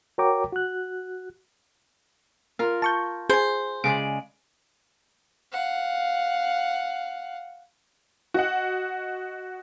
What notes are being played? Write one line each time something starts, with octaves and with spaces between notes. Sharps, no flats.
F#4 A#4 C#5 G5 A#5 D6
F#4 F#6
F4 A#4
A5 C#6 G6
G#4 C5 G#5
C#3 G#3 D5 D7
F5 F#5
F#4 D#5 F#5